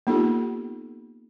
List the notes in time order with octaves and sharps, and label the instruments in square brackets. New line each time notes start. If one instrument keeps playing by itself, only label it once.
[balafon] A#3 B3 D#4 F4 G4 A4